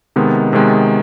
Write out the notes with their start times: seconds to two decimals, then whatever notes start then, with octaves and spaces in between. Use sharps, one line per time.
0.16 C3 D#3 G#3 B3
0.53 C3 D#3 G#3 B3